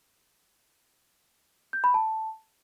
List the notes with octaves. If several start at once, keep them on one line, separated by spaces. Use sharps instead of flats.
G6
B5
A5